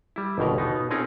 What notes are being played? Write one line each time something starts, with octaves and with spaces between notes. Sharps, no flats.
G3 E4
G1 D#2 B2 A#4
B2 B3 D#4
C4 C#4 D#4 F4 G#4 A#4